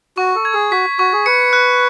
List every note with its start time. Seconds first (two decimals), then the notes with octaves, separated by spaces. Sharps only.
0.17 F#4 C#6
0.36 A4
0.45 G#6
0.54 G#4
0.72 F#4 B6
0.99 F#4 C#6
1.13 G#4
1.26 B4 C#7
1.53 F#6